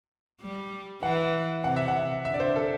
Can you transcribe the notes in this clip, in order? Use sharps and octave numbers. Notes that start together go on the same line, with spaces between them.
G3
E3 F#5
C3 F#5
E5
F#5
D3 E5
D5
C5
A4